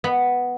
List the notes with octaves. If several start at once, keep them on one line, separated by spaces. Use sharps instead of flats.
B3